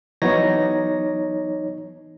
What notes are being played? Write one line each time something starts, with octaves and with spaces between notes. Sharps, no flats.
E3 F#3 B3 D#4 C#5 A#6